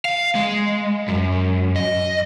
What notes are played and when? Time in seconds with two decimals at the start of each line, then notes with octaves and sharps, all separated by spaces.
0.05 F5
0.35 G#3
1.08 F#2
1.76 D#5